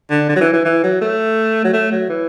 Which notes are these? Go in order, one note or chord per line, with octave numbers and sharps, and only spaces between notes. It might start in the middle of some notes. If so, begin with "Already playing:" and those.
D3
D3
F#3
E3
E3
E3
F#3
A3
F#3
A3
F#3
E3